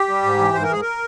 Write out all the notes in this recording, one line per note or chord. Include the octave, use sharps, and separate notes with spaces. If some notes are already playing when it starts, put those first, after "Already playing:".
Already playing: G4
G3
G#2
E3
G#2 C5
A#4
G#2 G#4
A#4